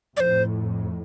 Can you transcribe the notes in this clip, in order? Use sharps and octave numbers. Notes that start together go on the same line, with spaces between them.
F2 A2 C5 D5